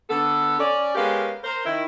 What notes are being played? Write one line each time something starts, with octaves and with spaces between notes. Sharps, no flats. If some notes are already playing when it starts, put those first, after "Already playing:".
D3 B3 A4
C#4 D5
G#3 B3 C#4 G4 A#4 F5
A#4 C5
D#3 E4